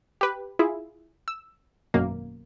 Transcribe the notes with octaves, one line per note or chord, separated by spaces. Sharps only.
G4 B4
E4 F4 G#4 E5
E6
G#1 F#2 B2 A#3